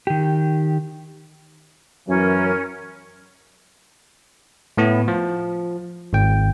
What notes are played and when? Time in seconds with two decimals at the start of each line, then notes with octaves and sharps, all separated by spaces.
0.07 D#3 G4
2.07 F#2 E3 F#3 C#4 A#4
4.77 A2 B3 E4
5.08 F3
6.13 G#1 G5